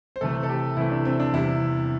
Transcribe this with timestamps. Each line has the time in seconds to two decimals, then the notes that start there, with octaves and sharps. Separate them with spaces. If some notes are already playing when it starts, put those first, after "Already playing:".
0.16 C5
0.21 C3 E3 A3 A4
0.43 A4
0.49 G4
0.77 C3 E3 A3 E4
0.91 D4
1.05 C4
1.20 D4
1.33 E2 C3 G3 E4